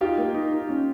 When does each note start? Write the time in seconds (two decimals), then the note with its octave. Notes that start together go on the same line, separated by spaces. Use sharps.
0.01 D#4 F4 G4
0.18 A#3
0.34 D#4
0.51 D#4
0.69 C#4